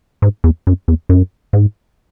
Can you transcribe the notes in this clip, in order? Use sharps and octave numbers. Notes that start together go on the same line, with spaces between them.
G#2
E2
F#2
E2
F#2
G#2